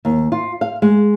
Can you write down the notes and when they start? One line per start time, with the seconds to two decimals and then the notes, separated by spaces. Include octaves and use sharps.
0.05 D#2
0.32 F4
0.61 F5
0.82 G#3